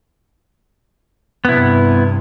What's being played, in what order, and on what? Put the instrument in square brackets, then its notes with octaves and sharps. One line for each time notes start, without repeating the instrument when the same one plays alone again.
[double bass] G2 C3 [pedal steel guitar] B3 E4